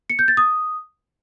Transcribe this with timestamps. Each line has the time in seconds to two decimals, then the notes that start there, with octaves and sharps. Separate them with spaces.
0.10 C#7
0.19 G6
0.28 A6
0.37 D#6